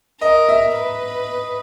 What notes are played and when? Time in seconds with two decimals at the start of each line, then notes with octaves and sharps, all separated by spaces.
0.21 A#4 D#5
0.49 E5
0.76 B4